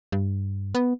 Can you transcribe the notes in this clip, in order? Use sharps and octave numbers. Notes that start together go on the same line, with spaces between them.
G2
B3